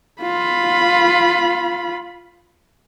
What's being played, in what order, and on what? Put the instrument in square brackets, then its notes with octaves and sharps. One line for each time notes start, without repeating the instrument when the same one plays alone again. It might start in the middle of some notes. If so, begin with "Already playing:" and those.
[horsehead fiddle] F4 B5